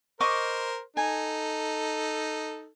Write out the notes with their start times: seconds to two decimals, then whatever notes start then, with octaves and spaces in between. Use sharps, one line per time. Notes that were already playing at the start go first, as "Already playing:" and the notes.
0.21 A#4 C5 D#5 C#6 D6
0.97 D#4 A4 G#5